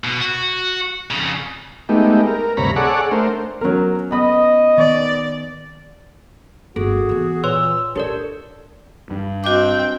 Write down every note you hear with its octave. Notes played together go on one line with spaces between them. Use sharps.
B2
F#4
F2 C#3
G#3 A3 B3 D#4 G4
A#4
D2 G2 C3 C#5 A#5 B5
G#4 A4 C#5 D5 F#5
A3 D4 A#4 C5
F#3 B3 C#4 A#4
B3 D#5 B5 D#6
D#3 B3 D5
G1 F#4 G#4 A4
E3 B3
A#2 B4 C#5 C6 E6
D4 G4 A4 A#4 C#5 D5
G2
C4 F#4 D#5 G5 D6